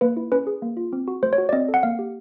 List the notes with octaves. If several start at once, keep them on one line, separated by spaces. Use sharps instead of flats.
A#3 B4
E4
C#4 B4
G#4
A#3
F4
C4
F#4
A3 C5
C#5
F#4
D5
C4 D#5
A4
F#5
A#3 F5
G4